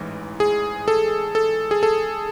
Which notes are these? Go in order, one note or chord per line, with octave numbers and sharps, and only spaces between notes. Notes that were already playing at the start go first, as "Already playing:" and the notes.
Already playing: A1 G#2 E3
G#4
A4
A4
G#4
A4